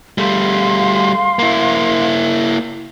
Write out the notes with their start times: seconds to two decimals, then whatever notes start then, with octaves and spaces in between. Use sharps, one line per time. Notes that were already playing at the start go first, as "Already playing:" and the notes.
0.18 G3 A3 F5 C6
1.39 A#3 E4